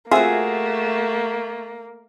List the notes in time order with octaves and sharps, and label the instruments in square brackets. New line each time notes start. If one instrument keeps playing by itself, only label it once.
[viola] A3 [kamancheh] A#3 [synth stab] C4 F4 E5 [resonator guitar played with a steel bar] F#4 G#4